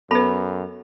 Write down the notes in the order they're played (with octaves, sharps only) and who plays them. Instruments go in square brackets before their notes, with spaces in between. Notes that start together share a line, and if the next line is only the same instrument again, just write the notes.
[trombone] F#2 [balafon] B3 B4 [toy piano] A4 B5